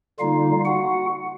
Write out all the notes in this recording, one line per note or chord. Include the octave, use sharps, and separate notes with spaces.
D3 G3 A#3 D#4 F4 F5
F#4 F#5